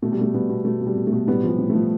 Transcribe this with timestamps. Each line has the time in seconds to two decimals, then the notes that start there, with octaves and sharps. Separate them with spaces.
0.02 B2 A3
0.12 G3
0.18 B2 A3
0.34 B2 G3 B3
0.49 B2
0.65 B2 A3
0.81 B2
0.86 G3
0.96 B2
1.07 A3
1.13 B2
1.27 A2 G3 B3
1.44 F3 G3
1.58 A2
1.70 F3 A3